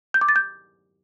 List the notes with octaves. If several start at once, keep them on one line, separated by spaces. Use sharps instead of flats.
G6
D6
A6
G6